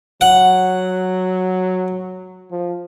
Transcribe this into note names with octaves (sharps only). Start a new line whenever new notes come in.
F#3 F#5
F3